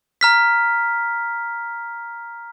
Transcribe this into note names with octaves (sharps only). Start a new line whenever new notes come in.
A#5 F6 B6